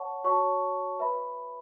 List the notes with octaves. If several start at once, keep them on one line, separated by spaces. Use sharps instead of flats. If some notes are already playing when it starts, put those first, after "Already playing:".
Already playing: C#5 F#5 A5 C#6
F#4 C#5 A5 C#6
B4 E5 B5